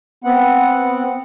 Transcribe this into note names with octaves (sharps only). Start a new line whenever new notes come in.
B3 C4 F#5